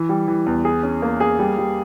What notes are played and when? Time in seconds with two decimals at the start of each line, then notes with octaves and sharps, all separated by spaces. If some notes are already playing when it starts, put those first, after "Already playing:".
Already playing: E3
0.09 G3
0.28 E3
0.46 E2
0.65 G#4
0.83 C#4
1.02 A#3
1.20 G#4
1.39 G3
1.58 G3